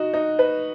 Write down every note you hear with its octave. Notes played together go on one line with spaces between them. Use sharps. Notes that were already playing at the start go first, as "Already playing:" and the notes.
Already playing: D#4 F#4
D#4
B4